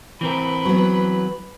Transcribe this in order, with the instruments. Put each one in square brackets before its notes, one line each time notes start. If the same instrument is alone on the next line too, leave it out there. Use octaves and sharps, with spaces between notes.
[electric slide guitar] E3 C4 A#4 [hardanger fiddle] B4
[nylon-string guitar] F#3 B3